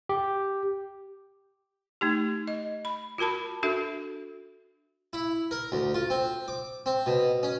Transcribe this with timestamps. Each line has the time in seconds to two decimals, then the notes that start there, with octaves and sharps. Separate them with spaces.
0.09 G4
2.01 A3 D#4 G4
2.48 D#5
2.85 B5
3.18 F4 F#4 A#4 A5 B5
3.63 D4 F#4 A4 E5
5.13 E4
5.51 A#4
5.72 D2
5.94 F4
6.10 C4
6.48 D6
6.86 C4
7.06 B2
7.43 C#4